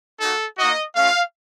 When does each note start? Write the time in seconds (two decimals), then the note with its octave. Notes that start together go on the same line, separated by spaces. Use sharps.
0.21 A#3 D#4 F#4 A4
0.58 A#3 D#4 F#4 D#5
0.96 A3 C#4 F4 F5